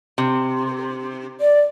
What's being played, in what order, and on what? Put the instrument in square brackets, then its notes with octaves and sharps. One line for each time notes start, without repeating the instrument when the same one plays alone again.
[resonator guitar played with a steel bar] C3
[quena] D5